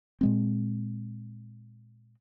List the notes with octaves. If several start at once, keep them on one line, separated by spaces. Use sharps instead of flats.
A#2 G#3 C4